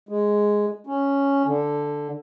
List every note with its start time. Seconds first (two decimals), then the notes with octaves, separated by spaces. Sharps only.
0.09 G#3
0.87 C#4
1.46 D3